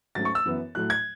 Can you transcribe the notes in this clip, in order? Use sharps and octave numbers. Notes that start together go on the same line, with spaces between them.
G#2 F#3 A3 C#4 A6
C#6
E6
F#2 E3 B3
A2 F#3 A3 F#6
G#6